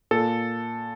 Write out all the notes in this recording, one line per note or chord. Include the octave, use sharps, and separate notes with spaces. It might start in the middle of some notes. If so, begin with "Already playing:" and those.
A#2 A4